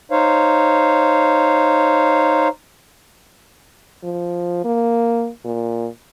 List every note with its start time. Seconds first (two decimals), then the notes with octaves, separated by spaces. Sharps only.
0.11 D#4 C5 C#5 F5
4.04 F3
4.64 A#3
5.45 A#2